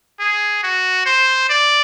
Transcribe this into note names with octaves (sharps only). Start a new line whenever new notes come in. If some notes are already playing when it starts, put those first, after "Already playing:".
G#4
F#4
C5
D5